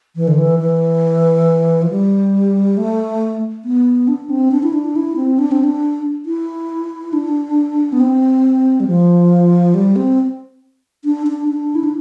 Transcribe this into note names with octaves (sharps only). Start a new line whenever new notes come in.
E3
D3
E3
E3
F3
G3
A3
B3
D4
C4
D4
E4
D4
E4
C4
D4
C4
D4
E4
D4
B3
C4
G3
F3
G3
C4
D4
D4
D4
E4
D4